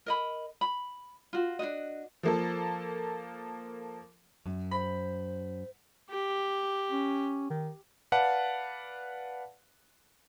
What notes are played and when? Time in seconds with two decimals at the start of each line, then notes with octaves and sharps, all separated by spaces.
0.06 A#4 D#5 B5
0.61 B5
1.33 F4 F#4
1.59 D4 D#4 F#4 D#5
2.23 F3 A#3 A4
4.46 F#2
4.71 C5 B5
6.10 G4
6.91 C#4
7.50 D#3
8.12 B4 D5 F5 F#5 A5